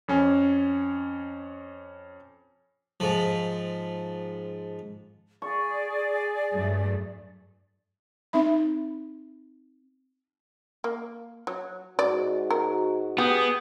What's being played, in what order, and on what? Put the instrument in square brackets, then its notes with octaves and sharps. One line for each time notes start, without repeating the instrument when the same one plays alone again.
[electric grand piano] F2 C#4 G#5
[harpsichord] G#2 F3
[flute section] G#4 D5 [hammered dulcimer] C#6
[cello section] G2 F#3 A3
[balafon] C4 D#4 E5 B5
[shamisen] A#3
F#3
[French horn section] G#2 F#4 [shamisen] D5
[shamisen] A#4
[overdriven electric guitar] B3 [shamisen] G4 [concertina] G#4 G5